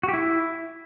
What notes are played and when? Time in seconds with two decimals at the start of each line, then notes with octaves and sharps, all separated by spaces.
0.03 F#4
0.08 G4
0.13 E4